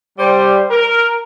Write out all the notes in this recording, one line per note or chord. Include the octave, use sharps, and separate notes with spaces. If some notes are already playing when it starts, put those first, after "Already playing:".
G3 C5
A#4